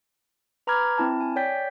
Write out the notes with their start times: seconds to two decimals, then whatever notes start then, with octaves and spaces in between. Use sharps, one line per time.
0.67 B4 A#5 B5 D6 F6 G#6
0.98 C4 E4 A5
1.21 G#5
1.36 C#5 D5 G5 G6 B6